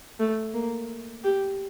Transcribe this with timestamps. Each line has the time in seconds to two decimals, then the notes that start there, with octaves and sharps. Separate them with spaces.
0.19 A3
0.54 A#3
1.24 G4